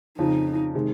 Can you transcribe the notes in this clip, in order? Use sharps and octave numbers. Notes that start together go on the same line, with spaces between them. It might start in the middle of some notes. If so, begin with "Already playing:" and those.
F2 C#3 F3 D#4
C3 D#3 G#3